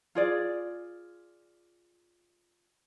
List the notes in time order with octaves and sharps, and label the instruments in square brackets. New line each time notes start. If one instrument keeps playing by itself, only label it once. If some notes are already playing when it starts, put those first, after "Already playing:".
[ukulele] F4 G#4 D5